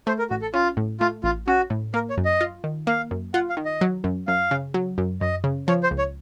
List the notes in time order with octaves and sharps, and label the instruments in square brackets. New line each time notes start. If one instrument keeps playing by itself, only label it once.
[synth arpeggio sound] A3 [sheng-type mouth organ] C5
[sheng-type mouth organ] A#4
[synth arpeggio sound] A1 [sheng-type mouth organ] F#4
[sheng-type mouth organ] A4
[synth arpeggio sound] C#4 [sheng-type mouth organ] F4
[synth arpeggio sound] A2
[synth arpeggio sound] A3 [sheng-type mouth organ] F4
[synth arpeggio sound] A1 [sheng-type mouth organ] F4
[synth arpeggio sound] C#4 [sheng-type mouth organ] F#4
[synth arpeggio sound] A2
[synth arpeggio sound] A#3 [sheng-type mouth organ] A#4
[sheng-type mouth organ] C#5
[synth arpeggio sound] F#2
[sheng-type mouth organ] D#5
[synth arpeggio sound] F4
D#3
[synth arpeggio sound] A#3 [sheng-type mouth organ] F5
[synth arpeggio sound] F#2
[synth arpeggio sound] F4 [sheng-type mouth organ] F#5
[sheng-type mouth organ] F5
[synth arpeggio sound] D#3
[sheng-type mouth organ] D#5
[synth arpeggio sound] F#3
F#2
[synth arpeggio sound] F#2 [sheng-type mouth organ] F5
[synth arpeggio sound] C#3
F#3
F#2
[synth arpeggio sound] F#2 [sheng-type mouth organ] D#5
[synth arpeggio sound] C#3
[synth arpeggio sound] F3 [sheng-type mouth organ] C#5
[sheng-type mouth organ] C5
[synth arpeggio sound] C#2
[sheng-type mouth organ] C#5